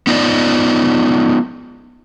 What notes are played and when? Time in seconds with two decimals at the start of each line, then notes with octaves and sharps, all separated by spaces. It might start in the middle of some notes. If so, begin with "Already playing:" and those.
0.07 B3 D#4 F4 D5